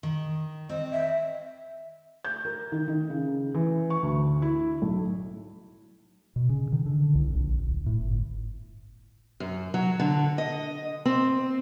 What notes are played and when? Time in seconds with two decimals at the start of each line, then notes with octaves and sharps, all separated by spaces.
0.03 D#3
0.69 C4 D#5
0.91 E5
2.25 G6
2.45 A#4
2.72 D#3
2.88 D#3
3.10 C#3
3.54 E3
3.90 C#6
4.03 D2
4.42 E4
4.82 B1
6.36 B2
6.49 C#3
6.72 D#3
6.86 D3
7.15 C2
7.34 A#1
7.64 D1
7.86 A2
8.01 G1
9.40 F#2
9.74 F#3
10.00 D3
10.38 D#5
11.05 C4